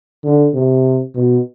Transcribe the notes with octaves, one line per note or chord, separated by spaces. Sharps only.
D3
C3
B2